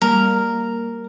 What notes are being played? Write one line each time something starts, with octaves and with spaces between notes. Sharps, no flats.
G3 A#3 A#4